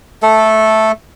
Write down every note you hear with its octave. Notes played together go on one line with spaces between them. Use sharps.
A3 A4